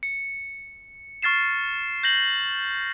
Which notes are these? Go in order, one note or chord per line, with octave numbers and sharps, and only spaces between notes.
C#7
C#6 F6 A6 C7 E7
G6 A#6 F#7